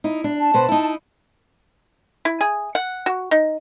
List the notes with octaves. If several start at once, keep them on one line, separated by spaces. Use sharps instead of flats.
D#4 E4
D4
A5
B2 B4 C5
D#4 E4
E4
G#4
F#5
F#4
D#4